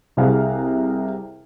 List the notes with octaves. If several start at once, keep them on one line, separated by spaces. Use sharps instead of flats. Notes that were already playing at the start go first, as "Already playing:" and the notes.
C2 C3 G#4 F5 F#5